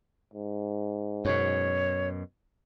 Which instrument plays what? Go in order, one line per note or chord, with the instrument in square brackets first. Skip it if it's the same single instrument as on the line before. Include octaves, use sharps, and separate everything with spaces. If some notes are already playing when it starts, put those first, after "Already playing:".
[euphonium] G#2
[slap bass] F#2 B2 [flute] C#5